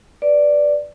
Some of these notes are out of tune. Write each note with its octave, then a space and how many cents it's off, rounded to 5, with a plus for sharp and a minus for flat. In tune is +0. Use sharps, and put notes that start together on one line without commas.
B4 +0 D5 +0